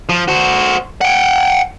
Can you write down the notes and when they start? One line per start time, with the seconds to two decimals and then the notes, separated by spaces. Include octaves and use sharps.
0.09 F3
0.28 F#4 C5
1.01 F#5 G5